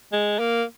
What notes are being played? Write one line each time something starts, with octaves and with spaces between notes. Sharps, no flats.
G#3
A#3